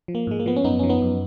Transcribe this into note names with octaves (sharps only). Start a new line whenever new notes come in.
F3
A#3
G#2 G#3
A#3
F3 B3
C#4
F#2 B3 D#4
F3 C#4
B3 D#4
F#2